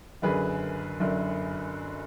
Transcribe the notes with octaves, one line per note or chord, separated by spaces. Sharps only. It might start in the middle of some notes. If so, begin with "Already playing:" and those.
F#1 F#2 D3 G#4 B4
F#1 F#2 D3